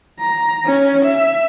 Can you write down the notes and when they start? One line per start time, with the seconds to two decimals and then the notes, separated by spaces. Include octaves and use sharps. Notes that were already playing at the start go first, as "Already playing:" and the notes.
0.20 A#5
0.65 C#4
1.05 E5